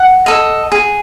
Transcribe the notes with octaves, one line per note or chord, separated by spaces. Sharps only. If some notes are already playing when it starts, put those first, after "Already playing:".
Already playing: F#5
A4 D#5
G#4